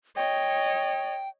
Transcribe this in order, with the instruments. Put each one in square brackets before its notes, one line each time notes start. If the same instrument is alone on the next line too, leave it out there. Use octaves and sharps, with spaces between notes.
[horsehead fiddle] C#5 D#5 [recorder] G5